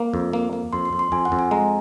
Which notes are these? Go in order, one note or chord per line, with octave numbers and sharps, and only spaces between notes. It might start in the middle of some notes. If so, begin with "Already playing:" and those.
Already playing: A#3
F2
A#3
A#3
F2 C6
C6
F2
C6
F2 G#5
F#5
F2
G#5
G#3 A#5